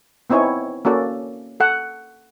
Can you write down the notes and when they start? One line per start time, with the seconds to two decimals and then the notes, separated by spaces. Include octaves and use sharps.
0.30 B3 C4 D#4 E4 C#5 G#5
0.85 A#3 C#4 F#4 A4 D5
1.60 A4 F#5